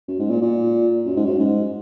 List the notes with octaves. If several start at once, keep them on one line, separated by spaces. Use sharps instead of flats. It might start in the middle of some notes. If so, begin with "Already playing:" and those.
F#2
G#2
A#2
A#2
F#2
G#2
F#2
G#2